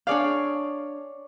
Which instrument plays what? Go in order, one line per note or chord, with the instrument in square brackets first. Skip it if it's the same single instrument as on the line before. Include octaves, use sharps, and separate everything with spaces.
[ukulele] D4 G#4 F5 [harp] C#5 D5 F6